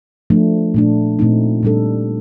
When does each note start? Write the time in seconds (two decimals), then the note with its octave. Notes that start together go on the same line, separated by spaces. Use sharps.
0.30 F3 A3 D4
0.74 A#2 A3 D4
1.19 A#2 A3 C4 D#4
1.63 A#2 G3 D4 A4